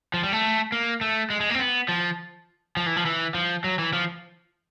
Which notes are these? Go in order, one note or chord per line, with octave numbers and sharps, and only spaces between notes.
F3
G3
A3
A#3
A3
G#3
G#3
A#3
C4
B3
F3
F3
E3
F3
E3
F3
F#3
E3
F3